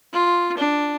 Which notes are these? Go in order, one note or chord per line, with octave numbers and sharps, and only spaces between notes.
F4
D4